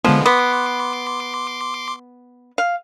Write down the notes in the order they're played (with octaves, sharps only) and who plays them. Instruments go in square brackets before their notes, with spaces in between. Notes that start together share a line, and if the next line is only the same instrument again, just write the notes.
[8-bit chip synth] D3 G#3 B3 [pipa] F3
[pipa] B3 [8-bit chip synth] C6 D6
[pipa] F5